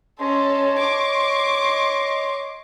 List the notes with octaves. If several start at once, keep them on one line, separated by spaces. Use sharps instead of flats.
C#4 A4 C#5 D#5 C6
C#6 D6